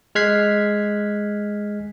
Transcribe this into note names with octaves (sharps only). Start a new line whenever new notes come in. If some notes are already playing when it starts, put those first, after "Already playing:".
G#3 F6 F#6 G#6 B6 C7